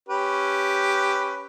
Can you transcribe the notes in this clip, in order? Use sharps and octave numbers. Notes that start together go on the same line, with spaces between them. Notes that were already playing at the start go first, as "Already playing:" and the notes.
C#4 G4 B4